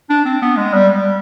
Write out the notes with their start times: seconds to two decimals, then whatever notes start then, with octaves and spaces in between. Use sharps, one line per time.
0.10 D4
0.25 C4
0.42 B3
0.57 G#3
0.73 G3